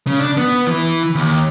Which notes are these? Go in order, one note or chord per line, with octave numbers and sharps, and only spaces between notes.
C#3
D4
B3
E3
D#2